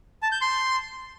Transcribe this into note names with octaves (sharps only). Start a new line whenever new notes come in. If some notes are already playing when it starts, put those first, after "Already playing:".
A5
G6
C6